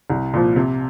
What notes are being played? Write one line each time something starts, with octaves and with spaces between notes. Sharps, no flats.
C2
A#2 F3
C3